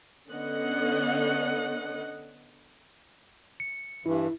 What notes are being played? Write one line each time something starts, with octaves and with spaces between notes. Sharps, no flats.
D3 B3 C#4 D#5 F#5
C#7
G2 E3 E4